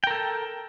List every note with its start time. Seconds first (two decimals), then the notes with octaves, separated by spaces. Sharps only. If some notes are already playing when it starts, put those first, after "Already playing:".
0.04 G5
0.07 A#4
0.11 A4